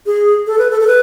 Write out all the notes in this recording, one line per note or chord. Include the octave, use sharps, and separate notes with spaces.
G#4
A4
B4
A4
A4
B4